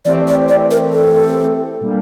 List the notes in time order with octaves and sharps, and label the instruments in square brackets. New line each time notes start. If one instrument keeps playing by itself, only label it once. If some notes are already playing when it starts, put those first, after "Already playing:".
[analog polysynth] E3 A3 C4 G4 [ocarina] D5
[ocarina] D5
D5
A#4
A4
[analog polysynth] A#2 G3 A#3 D4